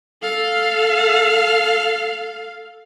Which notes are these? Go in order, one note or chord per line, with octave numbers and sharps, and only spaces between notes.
A4 F5